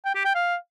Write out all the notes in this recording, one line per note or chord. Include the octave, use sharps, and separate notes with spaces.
G5
G4
G5
F5